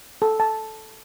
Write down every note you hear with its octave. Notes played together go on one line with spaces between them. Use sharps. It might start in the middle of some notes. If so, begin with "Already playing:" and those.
A4
A5